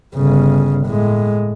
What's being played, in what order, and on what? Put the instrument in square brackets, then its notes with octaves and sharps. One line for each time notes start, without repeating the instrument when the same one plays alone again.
[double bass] G1 C#3
A2 G#3